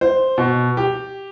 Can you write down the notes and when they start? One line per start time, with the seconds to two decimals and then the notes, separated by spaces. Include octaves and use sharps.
0.01 C5
0.38 B2
0.77 G4